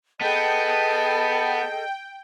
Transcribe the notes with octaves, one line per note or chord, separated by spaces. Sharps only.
B3 G#4 A4 D#5 G5 A5